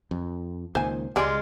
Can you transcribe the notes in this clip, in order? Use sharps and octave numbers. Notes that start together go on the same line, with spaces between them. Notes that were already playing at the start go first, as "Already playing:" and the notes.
F2
C#2 A#2 D#3 C5 G#5
C#2 G3 G#3 F4 D5 G#5